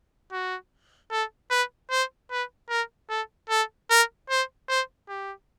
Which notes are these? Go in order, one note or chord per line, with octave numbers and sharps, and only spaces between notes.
F#4
A4
B4
C5
B4
A#4
A4
A4
A#4
C5
C5
G4